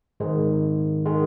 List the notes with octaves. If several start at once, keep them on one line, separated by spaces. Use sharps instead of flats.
G#2 D#3 G#3
D#3 G#3